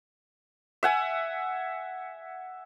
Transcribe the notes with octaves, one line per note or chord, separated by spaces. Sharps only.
E5 F#5 G#5